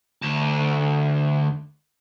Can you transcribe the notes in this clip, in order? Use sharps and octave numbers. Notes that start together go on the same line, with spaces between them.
D2 A5